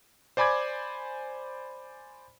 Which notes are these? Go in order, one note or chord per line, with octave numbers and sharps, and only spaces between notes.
C5 D5 G#5 B5 D6 G#6